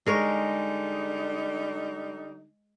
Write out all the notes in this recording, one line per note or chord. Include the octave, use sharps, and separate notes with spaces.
D3 G3 G#3 D#4 A#4 C#5